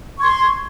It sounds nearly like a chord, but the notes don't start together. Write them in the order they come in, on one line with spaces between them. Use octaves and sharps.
C#6 G#6 C6